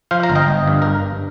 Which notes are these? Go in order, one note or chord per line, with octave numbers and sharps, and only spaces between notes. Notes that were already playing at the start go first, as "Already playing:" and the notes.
F3 C5 F5
F5 A#5
G1
D#5 G5
G1
G2
A#4